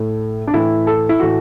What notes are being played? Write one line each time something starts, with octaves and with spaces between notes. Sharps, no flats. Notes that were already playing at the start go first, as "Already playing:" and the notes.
Already playing: A2 A3
D4
A2 E3 A3 E4
A4
E4
A2 E3 A3 F#4